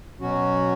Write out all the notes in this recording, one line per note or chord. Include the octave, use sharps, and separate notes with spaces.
B2 F#3 C#4 F#4